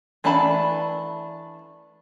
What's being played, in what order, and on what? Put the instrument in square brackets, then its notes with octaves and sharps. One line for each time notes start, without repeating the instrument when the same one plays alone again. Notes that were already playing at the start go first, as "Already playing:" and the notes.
[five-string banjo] E3 A3 D4 A5 B5